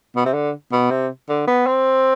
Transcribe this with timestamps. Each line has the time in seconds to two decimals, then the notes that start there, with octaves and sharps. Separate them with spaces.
0.16 B2
0.25 C3
0.33 D3
0.72 B2
0.90 C3
1.29 D3
1.48 B3
1.67 C4